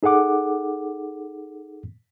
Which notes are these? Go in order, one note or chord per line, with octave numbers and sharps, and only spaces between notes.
D#4 G#4 A4 F#5 D6